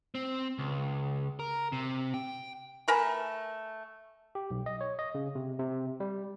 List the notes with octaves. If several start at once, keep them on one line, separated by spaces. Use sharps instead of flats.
C4
C#2
A#4
C3
G5
A3 A#4 B4 G#5
G4
B1
D#5
C#5
D#5
C#3
C3
C3
G3